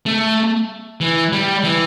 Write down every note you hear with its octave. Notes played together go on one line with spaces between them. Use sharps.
A3
E3
G3
E3